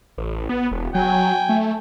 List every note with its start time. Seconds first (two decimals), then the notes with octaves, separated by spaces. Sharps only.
0.18 A1
0.49 B3
0.72 E1
0.95 F#3 G5 G#5
1.49 A3